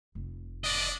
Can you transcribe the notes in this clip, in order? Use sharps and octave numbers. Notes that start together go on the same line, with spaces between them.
F1
D4 D5 D#5